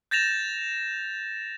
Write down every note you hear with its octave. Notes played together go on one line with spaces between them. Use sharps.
G6 A6 A#6 E7 F7